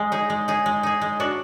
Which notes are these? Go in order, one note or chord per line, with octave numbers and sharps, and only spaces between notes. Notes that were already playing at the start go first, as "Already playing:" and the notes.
Already playing: G#3
D#4 G#4
G#3
D#4 G#4
G#3
D#4 G#4
G#3
D4 F#4